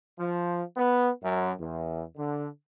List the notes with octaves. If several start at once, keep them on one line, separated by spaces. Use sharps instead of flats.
F3
B3
F#2
E2
D3